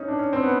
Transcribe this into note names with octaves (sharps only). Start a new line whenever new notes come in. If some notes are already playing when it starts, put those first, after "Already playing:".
Already playing: C#4 D#4
D4
C#4
C4
B3